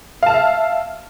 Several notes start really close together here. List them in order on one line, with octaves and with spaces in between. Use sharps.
F5 A5 F6 E5